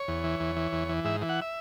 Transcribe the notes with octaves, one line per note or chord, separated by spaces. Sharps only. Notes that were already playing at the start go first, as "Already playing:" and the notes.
Already playing: C#5
E2
E3
E2
E3
E2
E3
G#2 E5
E3
F#5
E5